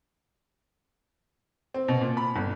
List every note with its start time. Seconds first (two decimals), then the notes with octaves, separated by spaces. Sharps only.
1.74 C4
1.88 B2
2.01 A#2
2.17 B5
2.36 G1